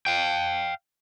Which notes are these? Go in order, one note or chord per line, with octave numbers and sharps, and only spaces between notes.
F5 G5